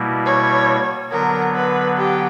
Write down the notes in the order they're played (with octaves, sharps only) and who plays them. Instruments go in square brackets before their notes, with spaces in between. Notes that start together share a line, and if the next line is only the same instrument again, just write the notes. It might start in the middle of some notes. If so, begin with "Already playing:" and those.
Already playing: [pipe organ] B2 G3 A#3 E4
[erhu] C#5
[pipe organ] D3 F#3 B3 [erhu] A#4
[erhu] B4
G4